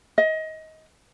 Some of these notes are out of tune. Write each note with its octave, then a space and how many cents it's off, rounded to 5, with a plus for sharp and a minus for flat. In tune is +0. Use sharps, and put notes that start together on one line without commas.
D#5 +25